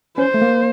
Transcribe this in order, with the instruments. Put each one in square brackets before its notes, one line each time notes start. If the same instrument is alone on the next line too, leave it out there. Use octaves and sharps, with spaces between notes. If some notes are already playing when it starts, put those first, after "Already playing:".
[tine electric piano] C#4 [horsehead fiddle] C5
[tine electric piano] A3
A#3